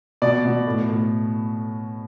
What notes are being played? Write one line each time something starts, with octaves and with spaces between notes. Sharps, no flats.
B2 D5
B2
A2
A2